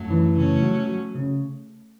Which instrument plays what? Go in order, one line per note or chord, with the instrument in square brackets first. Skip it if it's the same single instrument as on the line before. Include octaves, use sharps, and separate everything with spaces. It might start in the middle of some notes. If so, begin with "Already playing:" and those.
Already playing: [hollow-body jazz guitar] F#2 [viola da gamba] F#3 A3
[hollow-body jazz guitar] E3
[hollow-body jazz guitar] C#3 [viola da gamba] A3 C#4
[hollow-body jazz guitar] F#3
F#3
C#3